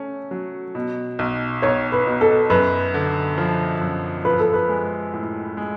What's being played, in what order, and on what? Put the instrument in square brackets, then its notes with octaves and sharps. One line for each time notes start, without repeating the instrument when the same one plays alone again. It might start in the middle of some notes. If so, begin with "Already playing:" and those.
Already playing: [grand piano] A3 C#4
F#3
B2
B1
[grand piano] B1 [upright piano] C#5
[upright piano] B4
[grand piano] B2
[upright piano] A4
[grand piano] F#2 [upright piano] B4
[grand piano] D3
F3
F#2
[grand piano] F3 [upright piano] B4
[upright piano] A4
B4
[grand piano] G#3
A2
G#3